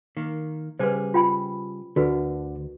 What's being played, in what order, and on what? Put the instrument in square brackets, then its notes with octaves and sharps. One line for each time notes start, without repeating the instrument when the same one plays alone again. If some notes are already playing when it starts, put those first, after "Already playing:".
[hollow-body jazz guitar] D#3 A#3
[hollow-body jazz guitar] C#3 G3 G#4 [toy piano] B4 C5
[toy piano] F4 G5 B5
[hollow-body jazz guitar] D2 [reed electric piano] D3 [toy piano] F#4 A#4 B4